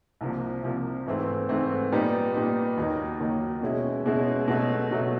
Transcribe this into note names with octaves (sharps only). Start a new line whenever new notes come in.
C2 C3 F3 A#3
C2 C3 F3 A#3
G#2 E3 A3 C4
G#2 E3 A3 C4
A#2 G3 B3 D#4
A#2 G3 B3 D#4
D#2 D#3 F#3 A#3 D#4
D#2 D#3 F#3 A#3 D#4
B2 G#3 C#4 E4
B2 G#3 C#4 E4
B2 F#3 A3
B2 F#3 A3